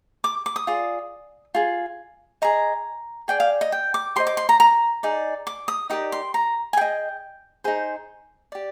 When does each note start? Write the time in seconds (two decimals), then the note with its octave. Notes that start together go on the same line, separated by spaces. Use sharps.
0.24 D6
0.46 D6
0.56 D#6
0.67 F4 G#4 D5
1.55 F4 G#4
2.42 G#4 D#5 A#5
3.28 G#4 D5 G5
3.40 F5
3.61 D#5
3.72 G5
3.94 D6
4.16 G4 C5 D#5 C6
4.27 D6
4.37 C6
4.49 A#5
4.60 A#5
5.03 D#4 G#4 D5
5.47 D6
5.68 D#6
5.90 D#4 G4 A#4 D5 D#6
6.12 C6
6.34 A#5
6.73 G#5
6.77 G#4 D#5 G5
7.64 D#4 G#4 C5
8.52 G4 D5